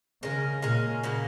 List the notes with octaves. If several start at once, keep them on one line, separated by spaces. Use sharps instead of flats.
C#3 G#3 C#4 A#4
A#2 G#3 C#4 A#4
C#3 F#3 A#3